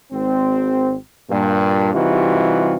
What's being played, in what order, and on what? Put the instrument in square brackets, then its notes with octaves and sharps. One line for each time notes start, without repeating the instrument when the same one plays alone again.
[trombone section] G#1 C4
G2 A#2
C3 E3 G3 D#4 F4 F#4